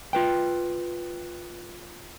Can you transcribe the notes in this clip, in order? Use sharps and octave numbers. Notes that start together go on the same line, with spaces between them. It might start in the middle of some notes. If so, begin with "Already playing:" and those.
F4 B4 G5